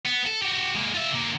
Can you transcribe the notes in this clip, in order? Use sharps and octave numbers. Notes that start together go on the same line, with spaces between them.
B3
A4
F#4 G4
G#3 A#3
F4 E5
D3 A#3